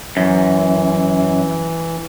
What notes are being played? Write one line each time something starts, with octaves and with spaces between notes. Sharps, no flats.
F#2 E3